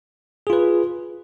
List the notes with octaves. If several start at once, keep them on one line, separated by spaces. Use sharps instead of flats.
F4 G#4 B4